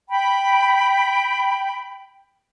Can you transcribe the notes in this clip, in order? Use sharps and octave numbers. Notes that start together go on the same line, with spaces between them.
G5 B5